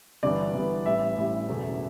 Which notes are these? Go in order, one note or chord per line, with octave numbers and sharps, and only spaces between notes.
G1 G2 E3 B3 D5
G1 G2 E3 B3
A1 A2 E3 G3 E5
A1 A2 E3 G3
F#1 E2 B2 A3